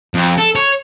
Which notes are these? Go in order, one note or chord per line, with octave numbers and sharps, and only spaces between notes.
F2
A4
C#5